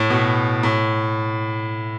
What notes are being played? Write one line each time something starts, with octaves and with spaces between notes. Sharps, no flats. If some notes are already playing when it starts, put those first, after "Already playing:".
Already playing: A2
B2
A2